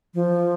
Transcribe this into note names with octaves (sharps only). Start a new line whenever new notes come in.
F3